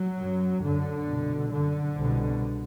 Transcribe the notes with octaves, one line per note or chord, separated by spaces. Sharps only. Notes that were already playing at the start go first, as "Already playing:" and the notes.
Already playing: F#3
F#2
F#2 D3
C2 B2
F#2 D3
C2 B2